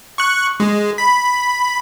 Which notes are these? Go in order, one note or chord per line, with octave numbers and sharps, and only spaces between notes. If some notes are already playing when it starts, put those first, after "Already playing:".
C#6 F#6
G#3
B5